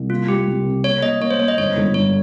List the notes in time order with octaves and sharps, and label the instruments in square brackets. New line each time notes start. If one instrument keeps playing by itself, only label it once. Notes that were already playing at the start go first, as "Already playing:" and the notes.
Already playing: [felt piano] C2
[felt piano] A#3 [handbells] F4
[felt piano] G3 [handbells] G4
[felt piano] C2
C3
[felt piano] A#3 [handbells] C#5
[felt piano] A#3 [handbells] D#5
[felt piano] A#3 [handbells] C#5
[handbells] C5
[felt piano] A#3 [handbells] C#5
[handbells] D#5
[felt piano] G1 [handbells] C#5
[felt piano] G1
[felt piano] G2 [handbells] C#5